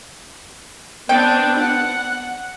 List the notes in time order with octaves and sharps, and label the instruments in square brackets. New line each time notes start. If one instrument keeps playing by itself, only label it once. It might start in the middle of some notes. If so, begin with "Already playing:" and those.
[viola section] B3 C4 D4 [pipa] G5
[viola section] F#5